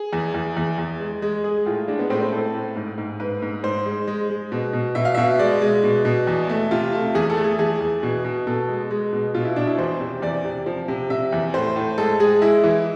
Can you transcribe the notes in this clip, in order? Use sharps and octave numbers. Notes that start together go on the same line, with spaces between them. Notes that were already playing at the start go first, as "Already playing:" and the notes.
Already playing: G#4
E2
E2
E2
E2
G#3
G#3
G#3 G#4
A2 F4
G#3 D4
B3
A2 C4
C4
A2 A4
A2
G#2
G#2
G#2 B4
G#2
G#2 C5
G#3
G#3
G#3
B2
B2
B2 E5
F5
B2 E5
G#3 D5
G#3
B2
B2
E2
A3
C3 F4
A3
E2 G#4
A4
A3
G#4
E2 G#4
E2
B2
B2
B2 A4
G#3
G#3
B2
B2 F4
E4
B2 D4
E4
E2 C5
C3
E2 D5
C3
F3
C3
C3 E5
E2
A2 C5
A2
G#3 A4
G#3 G#4
G#3 E4
E3